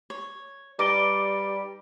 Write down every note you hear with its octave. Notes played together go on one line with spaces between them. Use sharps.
C#5
G3 D#4 B4 D5 D6 D7 G7